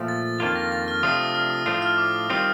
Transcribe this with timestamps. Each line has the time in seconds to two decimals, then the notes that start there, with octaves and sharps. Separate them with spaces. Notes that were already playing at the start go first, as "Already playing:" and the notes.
Already playing: A#2 F3 A3
0.08 A6
0.40 F2 D#3 A#3 D4 F4 A6
0.55 A#6
0.72 A6
0.88 F6
1.03 C3 F3 A3 D4 F4 D#6
1.35 F6
1.50 D#6
1.66 A2 F3 A3 D4 F4
1.82 F6
1.98 D6
2.30 D#3 G3 C4 F4 D#6